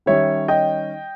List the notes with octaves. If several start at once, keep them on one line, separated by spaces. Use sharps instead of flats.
D#3 G3 C#4 C#5 E5
D#5 G5